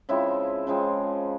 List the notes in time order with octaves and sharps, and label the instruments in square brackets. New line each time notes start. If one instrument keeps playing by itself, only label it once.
[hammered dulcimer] C#3 F3 G#3 C4 E4 E5
C#3 F3 G#3 C4